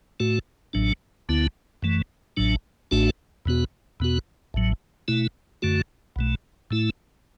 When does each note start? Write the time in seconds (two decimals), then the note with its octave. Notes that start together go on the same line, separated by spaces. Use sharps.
0.20 A2 A3 F#4
0.73 A1 A2 F#3 D4
1.29 D2 D3 B3 E4
1.82 F#2 E3 A3
2.37 A1 A2 F#3 D4
2.91 A1 A2 A3 D4 F#4
3.46 E2 B2 B3 F#4
4.00 E2 B2 B3 F#4
4.54 A1 A2 F#3
5.08 B2 A3 E4
5.62 F#2 D3 A3 F#4
6.16 B1 B2 A3
6.71 A2 A3 E4